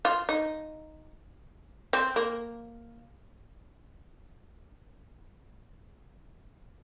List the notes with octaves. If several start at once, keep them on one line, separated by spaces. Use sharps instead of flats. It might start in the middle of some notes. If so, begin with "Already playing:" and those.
F4
D#4
C4
A#3